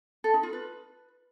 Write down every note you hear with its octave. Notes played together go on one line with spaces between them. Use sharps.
A4
D#4
F4
B4